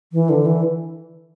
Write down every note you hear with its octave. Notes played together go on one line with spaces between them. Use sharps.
E3
D3
E3